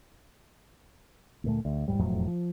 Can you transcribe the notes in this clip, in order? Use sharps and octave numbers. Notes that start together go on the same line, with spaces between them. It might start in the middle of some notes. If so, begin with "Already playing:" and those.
D2 A#2 A3
D2
D#1 G#2 G3
E1 F2 A2 F#3
F3